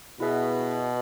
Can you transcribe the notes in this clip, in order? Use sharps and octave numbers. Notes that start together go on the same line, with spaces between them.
B2 E4 G#4 B4 E5